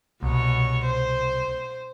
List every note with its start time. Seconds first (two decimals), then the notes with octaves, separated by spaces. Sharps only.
0.23 C2 B2 C#5
0.86 C5